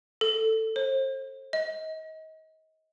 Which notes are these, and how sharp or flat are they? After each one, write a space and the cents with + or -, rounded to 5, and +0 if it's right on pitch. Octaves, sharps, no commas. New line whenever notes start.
A4 +10
C5 +35
D#5 +30